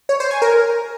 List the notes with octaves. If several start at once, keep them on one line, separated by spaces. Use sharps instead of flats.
C#5
C5
G#5
A#4